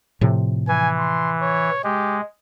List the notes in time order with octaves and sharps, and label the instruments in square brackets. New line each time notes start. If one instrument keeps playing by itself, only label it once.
[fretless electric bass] A2 C3 F3
[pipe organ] E3 [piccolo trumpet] G#5
[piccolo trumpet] C6
C#5
[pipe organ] G#3 [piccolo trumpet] G4